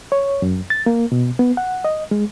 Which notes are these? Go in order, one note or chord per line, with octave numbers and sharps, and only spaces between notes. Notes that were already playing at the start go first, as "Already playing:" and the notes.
C#5
F#2
A6
A#3
B2
B3
F#5
D#5
G#3